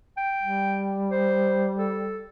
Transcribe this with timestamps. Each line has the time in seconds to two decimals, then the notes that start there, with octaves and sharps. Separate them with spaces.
0.17 G5
0.41 G3
1.11 C5
1.78 A4